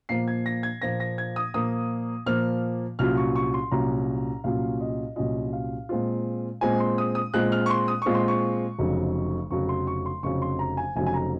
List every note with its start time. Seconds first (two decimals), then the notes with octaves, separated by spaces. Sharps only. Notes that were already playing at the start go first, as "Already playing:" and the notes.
0.09 A#2 F3 A#3 C7
0.28 G#6
0.46 A#6
0.63 G#6
0.82 A#2 F3 A#3 A#6
1.00 A#6
1.18 G#6
1.36 D#6
1.54 A#2 F3 A#3 D#6
2.26 A#2 F3 A#3 F6
2.99 C2 A#2 F#3 C#4 F4 F6
3.17 C#6
3.36 C#6
3.54 C6
3.71 C2 A#2 F#3 C#4 F4 A#5
4.44 C2 A#2 F#3 C#4 F4 F5
4.81 D#5
5.16 C2 A#2 F#3 C#4 F4 D#5
5.53 F5
5.89 A#2 G#3 C4 F4
6.61 A#2 G#3 C4 F4 G#5
6.80 C6
6.98 D#6
7.15 D#6
7.34 A#2 G#3 C4 F4 F#6
7.52 F6
7.66 C#6
7.70 C6
7.88 D#6
8.02 A#2 G#3 C4 F4 C#6
8.15 C6
8.28 C#6
8.79 F1 F2 C#3 F#3
9.51 F1 F2 C#3 F#3 C#6
9.69 C6
9.87 C#6
10.06 C6
10.23 F1 F2 C#3 F#3 C#6
10.42 C6
10.59 A#5
10.77 G#5
10.96 F1 F2 C#3 F#3 G#5
11.06 G#5
11.14 A#5